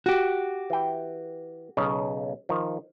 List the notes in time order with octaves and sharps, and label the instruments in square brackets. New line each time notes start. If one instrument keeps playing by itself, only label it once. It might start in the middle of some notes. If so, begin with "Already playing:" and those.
[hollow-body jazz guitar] F#4 G4
[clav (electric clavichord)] E3 G5
B1 C#3 D#5
D#3 F3